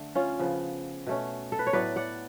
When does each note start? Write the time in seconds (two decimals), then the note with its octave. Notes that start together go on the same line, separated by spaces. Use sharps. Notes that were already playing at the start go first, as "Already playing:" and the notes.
Already playing: D3 A3
0.15 C#4 F4
0.39 C#3 F3 B3
1.07 B2 A3 C#4
1.52 A4
1.59 B4
1.67 C#5
1.73 A2 F#3 B3 B4 D5
1.96 D5 F#5